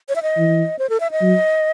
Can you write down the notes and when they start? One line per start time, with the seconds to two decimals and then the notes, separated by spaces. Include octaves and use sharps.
0.09 C#5
0.16 E5
0.23 D#5
0.37 E3
0.79 C5
0.90 A4
1.00 E5
1.11 D#5
1.21 F#3